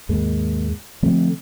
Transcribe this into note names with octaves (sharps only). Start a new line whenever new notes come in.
D#2 G#2 G#3 A#3
D3 F3 A3 C4